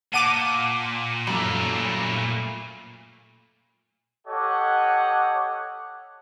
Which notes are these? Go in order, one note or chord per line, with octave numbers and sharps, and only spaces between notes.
A#2 F#5 A5 D6 D#7
F#2 G3 A3
G4 A4 C#5 D#5 F#5